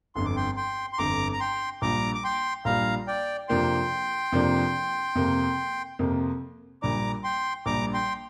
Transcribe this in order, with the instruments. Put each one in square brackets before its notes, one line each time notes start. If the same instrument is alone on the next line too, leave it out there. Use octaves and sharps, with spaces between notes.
[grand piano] G1 F2 D3 [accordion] C6
[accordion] D6
G5 C6
G5 C6
C6
[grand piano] G1 F2 D3 [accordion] A#5 D6
[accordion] A#5
G5 C6
[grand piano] A#1 A#2 G3 D4 F4 [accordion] A#5 D6
[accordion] D6
G5 C6
[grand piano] A#1 A#2 G3 D4 F4 [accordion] F5 A#5
[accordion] D5 G5
[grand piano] F2 C3 F3 A#3 D4 [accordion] G5 C6
[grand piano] F2 C3 F3 A#3 D4
F2 C3 A#3
F2 C3 A#3
[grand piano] A#1 A#2 G3 D4 [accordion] A#5 D6
[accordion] G5 C6
[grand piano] A#1 A#2 G3 D4 [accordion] A#5 D6
[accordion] G5 C6